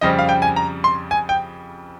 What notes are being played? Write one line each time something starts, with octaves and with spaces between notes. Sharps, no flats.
F2 C#3 G3 C4 D#5
F5
G5
G#5
A#5
C6
G#5
G5